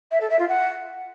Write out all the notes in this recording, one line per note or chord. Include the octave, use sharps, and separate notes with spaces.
E5
A4
E5
F4
F#5